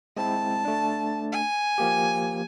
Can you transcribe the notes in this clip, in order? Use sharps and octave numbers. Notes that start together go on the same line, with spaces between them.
G#3 C4 E4 A5
A3 D4
G#5
F3 A#3 G4